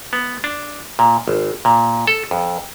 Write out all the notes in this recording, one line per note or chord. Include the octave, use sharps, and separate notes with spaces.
B3
D4
A#2
G#1
A#2
A4
F2